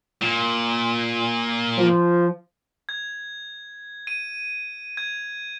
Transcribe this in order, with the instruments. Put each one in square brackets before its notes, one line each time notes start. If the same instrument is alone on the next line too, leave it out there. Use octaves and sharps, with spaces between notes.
[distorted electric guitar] A#2
[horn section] F3
[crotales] G#6
D#7
G#6